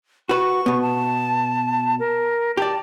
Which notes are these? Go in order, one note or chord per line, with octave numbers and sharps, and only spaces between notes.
F#4 B4 C#6
B2 B3
A5
A#4
G4 D5 A5